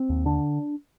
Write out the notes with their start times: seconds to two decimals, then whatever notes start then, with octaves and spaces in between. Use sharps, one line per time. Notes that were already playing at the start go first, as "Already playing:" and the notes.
Already playing: C4
0.09 D#2
0.25 D3 D4